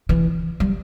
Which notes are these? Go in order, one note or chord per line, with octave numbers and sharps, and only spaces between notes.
E3
G3